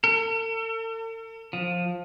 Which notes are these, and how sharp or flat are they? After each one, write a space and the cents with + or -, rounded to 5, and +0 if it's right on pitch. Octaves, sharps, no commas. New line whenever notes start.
A4 +45
F3 +15